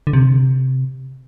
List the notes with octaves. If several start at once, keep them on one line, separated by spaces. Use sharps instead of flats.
D3
C3